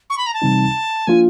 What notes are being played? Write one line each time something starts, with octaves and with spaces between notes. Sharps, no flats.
C#6
B5
A#5
A5
C3 E3 G3 C4 D#4
F3 A#3 D4 F4 G#5